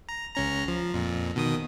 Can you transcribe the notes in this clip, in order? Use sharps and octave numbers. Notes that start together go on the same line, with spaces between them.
A#5
C#2 C#4 A#5
F3
F2 A#2
B2 D#3 D#6